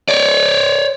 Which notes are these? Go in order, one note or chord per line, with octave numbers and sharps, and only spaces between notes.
C#5 D5